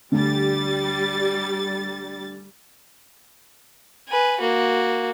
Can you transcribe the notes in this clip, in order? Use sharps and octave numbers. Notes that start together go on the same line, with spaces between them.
D2 D3 G3 A6
B4 G#5
A#3 F#4